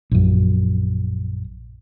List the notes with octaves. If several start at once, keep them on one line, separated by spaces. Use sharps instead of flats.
A#1 F#2